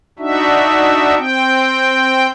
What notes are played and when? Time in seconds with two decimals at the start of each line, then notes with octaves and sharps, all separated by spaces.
0.19 D4 D#4 F#4 E5
1.18 C4 G5